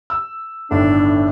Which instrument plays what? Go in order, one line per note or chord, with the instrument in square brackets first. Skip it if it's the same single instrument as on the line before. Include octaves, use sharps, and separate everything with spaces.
[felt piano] E6
[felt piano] G1 A2 D#3 [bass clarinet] D4